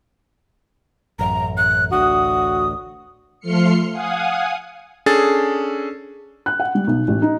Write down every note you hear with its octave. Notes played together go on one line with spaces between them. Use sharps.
A1 F#2 A#5
F#6
A1 D2 D3 F#4 D#6
F3 A3 C6 F6 C7 C#7
F5 F#5 G#5 D#6
C#4 D4 G#4 A4 A6
F#6
F#5
G3
B1
A1
D#4